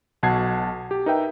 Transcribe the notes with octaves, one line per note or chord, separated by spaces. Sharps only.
B1 B2 F#5 A5 G#6 C7
G4
D#4 A#4 B4 E5 G5